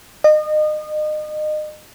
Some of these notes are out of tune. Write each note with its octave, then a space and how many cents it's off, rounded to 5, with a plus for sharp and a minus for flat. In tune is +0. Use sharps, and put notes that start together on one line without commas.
D#5 -30